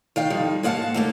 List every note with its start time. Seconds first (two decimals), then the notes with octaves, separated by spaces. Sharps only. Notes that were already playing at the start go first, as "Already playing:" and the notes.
0.16 D#3 F5 G5
0.30 F2 D#3 G3
0.63 G#2 A#3 F5 F#5 A5
0.94 D#2 A3 A#3